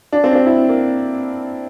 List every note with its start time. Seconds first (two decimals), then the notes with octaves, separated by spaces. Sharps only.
0.13 D4
0.24 C4
0.31 D4
0.35 C4
0.46 E4
0.69 A#3